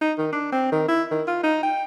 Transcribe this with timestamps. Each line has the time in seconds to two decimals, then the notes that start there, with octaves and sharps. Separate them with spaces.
0.02 D#4
0.18 D#3
0.32 D4
0.52 C4
0.72 D#3
0.89 E4
1.11 D#3
1.27 F4
1.43 D#4
1.63 G5